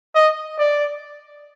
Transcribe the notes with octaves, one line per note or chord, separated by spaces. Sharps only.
D#5
D5